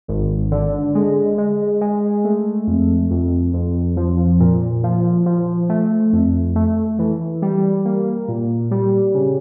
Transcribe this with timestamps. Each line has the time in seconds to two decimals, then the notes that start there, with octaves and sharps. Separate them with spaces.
0.08 G#1
0.51 D3
0.95 G#3
1.38 G#3
1.81 G#3
2.25 A3
2.67 F2
3.11 F2
3.54 F2
3.97 F3
4.40 A#2
4.83 F3
5.26 F3
5.69 A3
6.13 F2
6.56 A3
6.99 E3
7.42 G3
7.85 A#3
8.28 A#2
8.71 G3
9.14 C#3